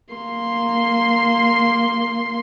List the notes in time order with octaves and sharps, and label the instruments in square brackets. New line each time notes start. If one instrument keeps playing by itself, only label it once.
[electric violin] A#3 C6